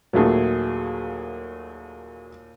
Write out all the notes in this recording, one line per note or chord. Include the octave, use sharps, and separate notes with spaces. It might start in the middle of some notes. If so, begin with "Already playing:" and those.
D#2 A#2 F#3 A3 G#4